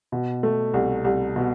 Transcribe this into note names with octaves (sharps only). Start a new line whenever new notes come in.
B2
A3
C2
C2
B2